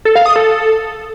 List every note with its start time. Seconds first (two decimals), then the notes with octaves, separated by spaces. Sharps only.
0.05 A4
0.15 F5
0.26 D#6
0.36 A4